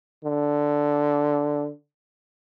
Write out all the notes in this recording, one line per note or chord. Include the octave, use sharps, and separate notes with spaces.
D3